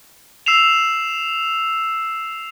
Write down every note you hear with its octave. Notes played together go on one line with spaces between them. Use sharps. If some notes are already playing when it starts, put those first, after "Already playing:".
E6 C7 E7 F7